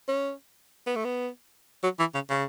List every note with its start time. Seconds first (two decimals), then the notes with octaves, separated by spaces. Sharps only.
0.08 C#4
0.87 B3
0.96 A3
1.05 B3
1.84 F#3
2.00 E3
2.15 C#3
2.30 C#3